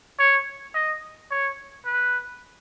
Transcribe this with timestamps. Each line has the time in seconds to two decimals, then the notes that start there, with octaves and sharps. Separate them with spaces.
0.19 C#5
0.75 D#5
1.31 C#5
1.86 B4